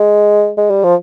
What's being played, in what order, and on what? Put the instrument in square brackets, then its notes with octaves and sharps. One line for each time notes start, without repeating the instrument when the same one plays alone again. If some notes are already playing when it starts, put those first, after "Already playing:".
Already playing: [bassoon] G#3
G#3
G3
F3